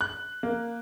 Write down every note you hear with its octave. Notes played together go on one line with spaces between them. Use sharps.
F#6
A#3